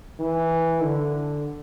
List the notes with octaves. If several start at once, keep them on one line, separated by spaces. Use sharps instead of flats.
E3
D3